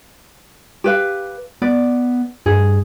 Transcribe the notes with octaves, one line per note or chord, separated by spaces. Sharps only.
G4 B4 F5
B3 D5
G2 G#4